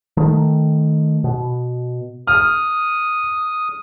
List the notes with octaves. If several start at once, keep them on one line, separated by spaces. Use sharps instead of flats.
D#3 A3
B2
D#6 F6